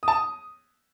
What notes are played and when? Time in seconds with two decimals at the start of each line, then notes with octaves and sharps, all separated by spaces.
0.03 D#6
0.08 A5
0.13 D#6